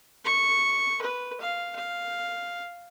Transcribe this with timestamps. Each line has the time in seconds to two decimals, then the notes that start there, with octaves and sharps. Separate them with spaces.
0.25 C#6
1.02 B4
1.41 F5
1.75 F5